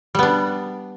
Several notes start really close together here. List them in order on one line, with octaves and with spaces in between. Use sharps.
G3 B3 D4